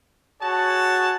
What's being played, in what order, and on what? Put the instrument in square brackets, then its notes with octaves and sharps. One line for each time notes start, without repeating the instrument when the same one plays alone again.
[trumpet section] F#4 G#4 C#5 A5